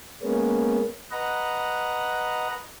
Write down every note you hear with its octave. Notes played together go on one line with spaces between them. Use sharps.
G#3 A#3 B3 C#4
B4 D#5 F#5 A#5